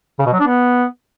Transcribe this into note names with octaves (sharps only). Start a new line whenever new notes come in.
C#3
B2
F#3
D4
B3